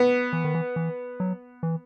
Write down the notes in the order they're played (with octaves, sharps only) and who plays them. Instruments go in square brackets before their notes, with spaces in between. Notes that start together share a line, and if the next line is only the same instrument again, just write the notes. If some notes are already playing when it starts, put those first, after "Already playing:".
Already playing: [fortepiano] B3
[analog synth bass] E3
D#3
E3
E3
F#3
E3